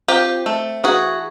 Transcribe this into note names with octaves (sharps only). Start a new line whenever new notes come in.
C4 F4 G4
A3
E3 F#4 G#4